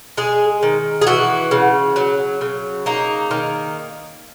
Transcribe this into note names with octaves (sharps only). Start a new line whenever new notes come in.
G#3 G#4
D#3
G#4
E3 F#4
C#3
F#3
C#3
A#3 D#4
D#3